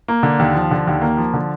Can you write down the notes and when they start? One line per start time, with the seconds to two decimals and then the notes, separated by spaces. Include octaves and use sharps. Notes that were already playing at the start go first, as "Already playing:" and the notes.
0.08 A#3
0.23 D3
0.39 D#2
0.55 F3
0.71 D3
0.87 D#2
1.02 A#3
1.17 F3
1.34 D3